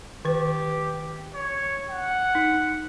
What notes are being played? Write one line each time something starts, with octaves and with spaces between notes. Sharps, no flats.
D#3 G4 B4
C#5
F#5
D#4